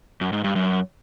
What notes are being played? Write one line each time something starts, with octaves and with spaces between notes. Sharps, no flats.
F#2
G#2
G2
F#2